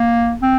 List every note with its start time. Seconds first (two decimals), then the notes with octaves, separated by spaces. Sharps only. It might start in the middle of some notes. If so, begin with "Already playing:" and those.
Already playing: A#3
0.42 C4